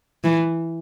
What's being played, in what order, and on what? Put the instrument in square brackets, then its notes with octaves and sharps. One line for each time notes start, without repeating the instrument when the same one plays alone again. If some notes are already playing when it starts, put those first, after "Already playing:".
[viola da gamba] E3